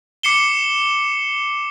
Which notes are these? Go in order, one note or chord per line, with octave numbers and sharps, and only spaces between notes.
D6 C7 C#7 E7 G7